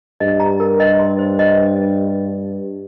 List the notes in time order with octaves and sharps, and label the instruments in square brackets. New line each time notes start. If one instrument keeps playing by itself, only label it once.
[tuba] G2 [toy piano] D#5
[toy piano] A#5
A#4
D#5
C6
C5
D#5